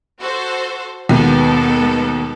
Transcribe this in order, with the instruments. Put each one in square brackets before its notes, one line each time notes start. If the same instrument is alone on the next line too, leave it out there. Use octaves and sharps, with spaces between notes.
[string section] F#4 A4 C5
[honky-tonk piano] D#2 B2 [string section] G#3 B3 A4